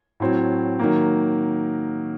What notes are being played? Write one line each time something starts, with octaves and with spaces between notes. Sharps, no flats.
A2 F#3 C4
D#3 F#3 A#3